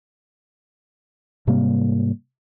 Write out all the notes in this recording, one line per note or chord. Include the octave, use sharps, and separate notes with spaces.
G#2 C3 G3 A#3